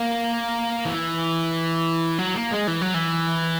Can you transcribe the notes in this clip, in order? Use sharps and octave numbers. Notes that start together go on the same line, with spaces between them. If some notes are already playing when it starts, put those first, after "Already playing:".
Already playing: A#3
E3
F#3
A#3
G#3
E3
F#3
E3